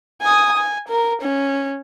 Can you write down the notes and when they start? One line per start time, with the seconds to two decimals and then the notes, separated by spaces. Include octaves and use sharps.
0.22 G#5 D#6
0.57 G#5
0.89 A#4
1.22 C#4